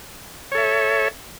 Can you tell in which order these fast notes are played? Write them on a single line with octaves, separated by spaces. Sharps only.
C#5 A4 E5